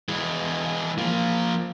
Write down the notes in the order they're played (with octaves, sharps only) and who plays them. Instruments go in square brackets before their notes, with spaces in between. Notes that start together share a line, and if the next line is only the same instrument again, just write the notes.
[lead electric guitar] E3 G#3
F3 A#3